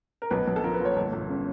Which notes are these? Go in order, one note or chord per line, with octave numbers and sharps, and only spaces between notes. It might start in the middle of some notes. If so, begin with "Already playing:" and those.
A#4
B1 B4
B1
A4
F3 A#4
B4
A#2
C#5
G1 A4
G1
C#3